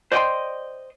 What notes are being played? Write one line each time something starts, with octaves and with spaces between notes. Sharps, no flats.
C5 D5 D#5 F#5 G5 C6